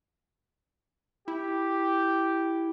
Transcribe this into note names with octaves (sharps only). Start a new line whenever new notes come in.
E4 G4